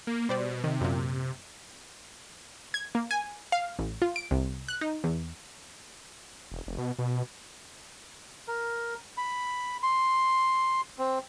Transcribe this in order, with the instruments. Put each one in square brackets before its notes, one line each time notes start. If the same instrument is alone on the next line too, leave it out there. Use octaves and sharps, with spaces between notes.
[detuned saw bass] A#3
[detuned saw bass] B2 [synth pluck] G3 C5 D5
[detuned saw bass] C3 [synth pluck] D#3
[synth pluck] F#2 A#2
G#6
A#3
G#5
F5
A1
F4
D7
C2
F#6
D#4
E2
[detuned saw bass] E1
F1
B2
B2
[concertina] A#4
B5
C6
C4